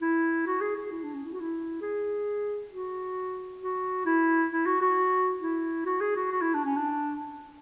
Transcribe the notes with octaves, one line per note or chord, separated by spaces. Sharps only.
E4
F#4
G#4
G#4
E4
D4
C#4
E4
F#4
E4
G#4
F#4
F#4
E4
E4
F#4
F#4
E4
F#4
G#4
F#4
F#4
E4
D4
C#4
D4